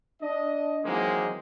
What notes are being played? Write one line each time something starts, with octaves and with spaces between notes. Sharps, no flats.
D4 D#5
D#3 E3 F#3 G#3 A#3 C4